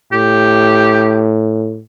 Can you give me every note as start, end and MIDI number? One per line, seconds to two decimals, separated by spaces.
0.13 1.81 45
0.13 1.28 67